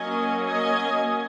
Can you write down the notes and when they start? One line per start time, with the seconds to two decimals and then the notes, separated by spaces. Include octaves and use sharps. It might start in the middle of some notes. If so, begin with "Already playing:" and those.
Already playing: F#3 A#3 C#4 D#5 G#5
0.46 D#5 G#5